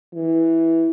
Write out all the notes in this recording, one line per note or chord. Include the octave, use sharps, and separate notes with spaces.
E3